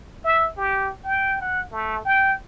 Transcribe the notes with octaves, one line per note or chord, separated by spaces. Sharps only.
E5
G4
G5
F#5
A3
G5